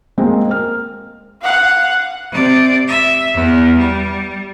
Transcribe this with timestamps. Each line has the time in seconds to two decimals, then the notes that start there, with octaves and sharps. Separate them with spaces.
0.18 G#3 A#3 C4
0.49 A#4 F6
1.42 F5 F#5
2.31 C3 D5
2.87 E5
3.34 E2
3.78 G3